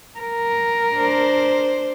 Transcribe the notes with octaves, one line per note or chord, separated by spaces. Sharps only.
A#4
D4 C5